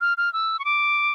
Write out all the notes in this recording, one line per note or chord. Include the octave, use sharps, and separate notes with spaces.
F6
F6
E6
C#6
D6